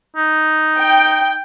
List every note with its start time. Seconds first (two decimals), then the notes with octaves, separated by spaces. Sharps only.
0.16 D#4
0.79 G5